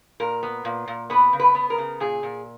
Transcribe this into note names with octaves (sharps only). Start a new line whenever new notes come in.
A#2 A#4
B3
A#2
A#2
B3 B4
C#3
B4
B3
A#4
C#3
A#2 G#4
A#2